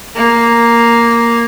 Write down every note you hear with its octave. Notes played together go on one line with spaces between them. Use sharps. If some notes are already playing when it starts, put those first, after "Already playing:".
A#3